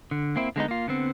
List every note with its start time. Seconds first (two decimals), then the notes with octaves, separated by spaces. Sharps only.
0.11 D3
0.36 A#3 C4 E4
0.56 D3 G#3 B3 D#4
0.68 A#3 F4
0.88 D3 B3 C4